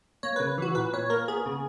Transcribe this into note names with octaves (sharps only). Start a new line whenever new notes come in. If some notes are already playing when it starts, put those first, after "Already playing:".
A#3 C#5
C#3 B4
E3 F#4
A#2 B4
A#2 C#5
A#3 A#4
B3 G#4
C#3